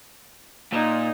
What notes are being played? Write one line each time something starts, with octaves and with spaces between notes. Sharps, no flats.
A#2 D#4